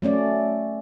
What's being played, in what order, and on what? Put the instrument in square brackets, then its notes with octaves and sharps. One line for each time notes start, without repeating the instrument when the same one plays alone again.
[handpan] F#3 A3 C#4 D5